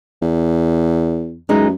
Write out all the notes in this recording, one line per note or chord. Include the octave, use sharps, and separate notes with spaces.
E2
F#2 E3 G#3 D#4